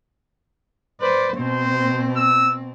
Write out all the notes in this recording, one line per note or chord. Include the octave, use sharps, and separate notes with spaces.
B4 C5 D5
B2 C4 C5
E6